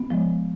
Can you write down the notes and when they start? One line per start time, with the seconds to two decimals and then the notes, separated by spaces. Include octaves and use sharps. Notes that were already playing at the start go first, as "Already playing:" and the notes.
Already playing: B3
0.10 F3 G#3